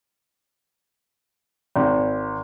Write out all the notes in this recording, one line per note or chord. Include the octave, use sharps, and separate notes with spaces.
G#1